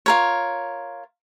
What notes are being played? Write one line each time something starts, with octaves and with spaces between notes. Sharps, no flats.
F4 A#4 C#5